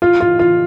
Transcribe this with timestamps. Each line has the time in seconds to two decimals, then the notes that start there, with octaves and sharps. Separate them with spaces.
0.02 F4
0.20 F4
0.39 F4